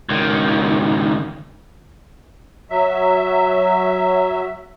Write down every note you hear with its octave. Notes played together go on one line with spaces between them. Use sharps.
C#2 D#3
F#3 E5